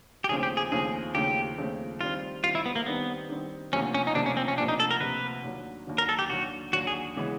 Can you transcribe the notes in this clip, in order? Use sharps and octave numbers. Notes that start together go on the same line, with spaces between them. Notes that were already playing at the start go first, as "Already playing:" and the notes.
G4
D#2 C#3 F3 A3 C4 G#4
G4
G#4
D#2 C#3 F3 A3 C4 G#4
D#2 C#3 F3 A3 C4 G4
D#2 C#3 F3 A3 C4
D#3 G3 C4 F4
D#3 G3 C4 F4
E4
B3
A#3
D#3 G3 B3 C4
D#3 G3 C4
D2 C3 F3 A#3 C#4
C#4
D#4
D2 C3 F3 A#3 D4
C#4
C4
C#4
D2 C3 F3 A#3 D4
D#4
A4
A#4
D2 C3 F3 A#3 B4
D#2 D3 F#3
D#2 D3 F#3
A#4
A4
G4
D#2 D3 F#3 F#4
D#2 D3 F#3 F#4
G#4
C#3 E3 G#3 B3